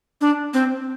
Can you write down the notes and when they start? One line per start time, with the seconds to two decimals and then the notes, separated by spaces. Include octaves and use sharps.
0.21 D4
0.54 C4